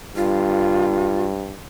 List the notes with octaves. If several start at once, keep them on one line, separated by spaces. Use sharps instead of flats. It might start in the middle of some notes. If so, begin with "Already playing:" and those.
G2 F4